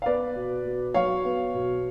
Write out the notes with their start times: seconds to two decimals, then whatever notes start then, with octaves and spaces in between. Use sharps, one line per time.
0.02 F5
0.06 B3 B4 D5
0.36 B2
0.65 B2
0.94 F#3 C#5 F5
1.25 B3
1.54 B2